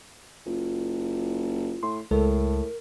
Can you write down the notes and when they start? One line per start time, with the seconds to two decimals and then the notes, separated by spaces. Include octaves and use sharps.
0.46 F#1 F4
1.83 A2 C6
2.11 C#2 A2 G#3 A4 A#4